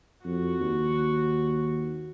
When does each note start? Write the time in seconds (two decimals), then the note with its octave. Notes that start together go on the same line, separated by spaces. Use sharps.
0.25 F2 F#4
0.60 D#2